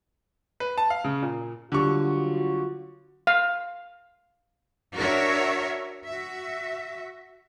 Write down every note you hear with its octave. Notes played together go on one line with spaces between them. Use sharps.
B4
A5
F5
C#3
A#2
D3 F#3 G3 F4 F#4 C#6
F5
D4 F#4 A#4 C#5 E5
F#4 E5